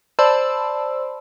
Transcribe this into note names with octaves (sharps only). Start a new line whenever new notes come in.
C5 D5 A5 B5 C6 E6